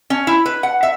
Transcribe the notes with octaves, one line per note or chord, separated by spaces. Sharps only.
C#4
E4
B4
F#5
E5